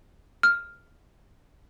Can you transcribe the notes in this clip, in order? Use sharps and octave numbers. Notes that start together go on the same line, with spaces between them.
F6